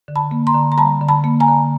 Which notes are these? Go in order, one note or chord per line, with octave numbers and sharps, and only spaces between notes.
D3
A5 B5
A#3
A#5 C6
D3
A#5
G3 A5 B5
D3
A5 B5
A#3
G#5 A#5
D3